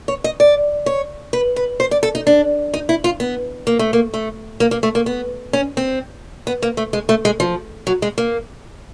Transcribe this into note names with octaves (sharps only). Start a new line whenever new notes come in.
C#5
D#5
D5
C#5
B4
B4
C5
D5
A4
D#4
D4
D#4
E4
F4
B3
A#3
A3
A#3
A3
A#3
A#3
A3
A#3
B3
C#4
C4
B3
A#3
A3
G#3
A3
G#3
F3
F#3
G#3
A#3